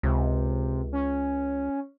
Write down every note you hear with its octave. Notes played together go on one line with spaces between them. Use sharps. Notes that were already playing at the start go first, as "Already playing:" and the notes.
C#2 C3
C#4